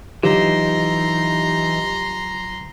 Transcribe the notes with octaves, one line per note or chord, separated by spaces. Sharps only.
D3 E3 F#3 D#4 F4 G4 A#5 C6